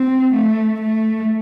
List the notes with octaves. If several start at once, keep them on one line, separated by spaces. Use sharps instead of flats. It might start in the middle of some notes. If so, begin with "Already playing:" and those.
Already playing: C4
A3
A3